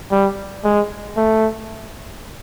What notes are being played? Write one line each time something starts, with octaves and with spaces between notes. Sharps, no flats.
G3
G#3
A3